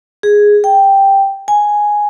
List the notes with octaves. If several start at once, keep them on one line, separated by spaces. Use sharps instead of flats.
G#4
G5
G#5